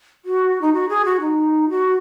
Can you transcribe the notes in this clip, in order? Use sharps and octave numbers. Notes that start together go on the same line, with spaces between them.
F#4
D#4
F#4
G#4
F#4
D#4
F#4